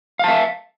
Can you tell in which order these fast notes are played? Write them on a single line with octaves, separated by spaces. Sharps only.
F5 A5 E5